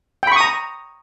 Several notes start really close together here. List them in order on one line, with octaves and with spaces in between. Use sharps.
G5 B5 C#6 D#6 A#5